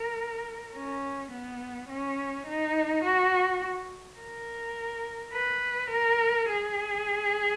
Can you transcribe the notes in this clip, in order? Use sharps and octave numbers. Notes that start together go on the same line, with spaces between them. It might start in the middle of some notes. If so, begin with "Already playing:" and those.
Already playing: A#4
C#4
B3
C#4
D#4
F#4
A#4
B4
A#4
G#4